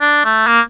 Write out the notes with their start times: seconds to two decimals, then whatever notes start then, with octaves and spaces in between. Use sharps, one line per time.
0.01 D4
0.25 A3
0.47 A#3